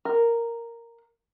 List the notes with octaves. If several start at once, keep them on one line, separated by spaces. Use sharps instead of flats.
A#4